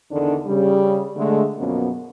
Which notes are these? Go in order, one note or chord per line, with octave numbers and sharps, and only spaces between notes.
E2 D3 D#3 D4
C#3 G3
D3 G#3 A3
F#2 B2 F3 A#3 B3 C#4